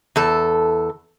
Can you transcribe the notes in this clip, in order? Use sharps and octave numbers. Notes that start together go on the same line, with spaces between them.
E2 A4